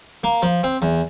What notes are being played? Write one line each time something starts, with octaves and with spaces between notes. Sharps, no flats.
A#3
F3
C4
E2